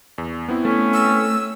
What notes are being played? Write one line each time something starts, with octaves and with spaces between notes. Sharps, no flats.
E2
B3 C4 E4
A3 C#4
E6